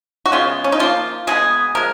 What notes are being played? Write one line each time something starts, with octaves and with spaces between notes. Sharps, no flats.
F#4
C#3 G#3 B3 F4
C#4
D#4
F3 A#3 F4
B2 G#3 B3 G#4
F3 G#3 A#4